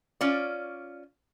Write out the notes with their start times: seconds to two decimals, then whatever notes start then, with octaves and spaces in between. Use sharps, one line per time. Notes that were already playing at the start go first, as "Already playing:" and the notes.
0.21 C#4 F4 D5